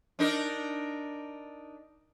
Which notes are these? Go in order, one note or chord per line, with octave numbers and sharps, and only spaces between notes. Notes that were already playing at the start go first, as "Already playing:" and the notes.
D4 D#4 A#4